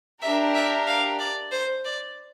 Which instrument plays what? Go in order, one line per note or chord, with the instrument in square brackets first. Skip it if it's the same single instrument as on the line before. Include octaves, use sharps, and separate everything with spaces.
[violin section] D4 G4 A#4 [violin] E5
[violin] E5
F5
D5
C5
D5